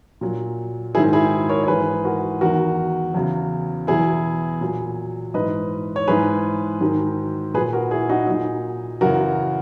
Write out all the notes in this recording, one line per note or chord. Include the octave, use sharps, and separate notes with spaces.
A#2 F#3
G#2 D#3 F#3 E4 G#4
E4 G#4
A#4 C#5
C#5
G#2 E3 G#4 B4
F#4 A#4
E2 D#3 F#3 F#4 A#4
E2 C#3 F#3
E2 B2 F#3 E4 G#4
A#2 F#3
G#2 E3 B4 D#5
C#5
G#2 E3 G#4 B4
G#2 D#3 F#3
A#2 F#3 G#4 B4
F#4 A#4
E4 G#4
D#4 F#4
A#2 F#3 D#4
F#2 C#3 E3 F#4 A#4